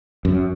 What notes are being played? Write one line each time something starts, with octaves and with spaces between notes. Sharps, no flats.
F#2